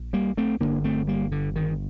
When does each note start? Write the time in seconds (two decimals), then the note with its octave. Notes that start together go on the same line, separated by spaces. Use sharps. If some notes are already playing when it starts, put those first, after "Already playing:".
Already playing: A#1
0.13 G3 A#3
0.37 A3 C4
0.60 G1 G2 D3 A#3 D4
0.84 A3 C4
1.07 G3 A#3
1.32 D3
1.56 D#3